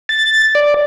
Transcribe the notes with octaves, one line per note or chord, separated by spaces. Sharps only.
A6
D5